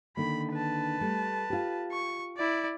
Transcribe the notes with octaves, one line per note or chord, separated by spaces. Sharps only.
D3 D#3 A#3 B5
B4 A5
G3 A3
F4 G4
C#6
E4 D5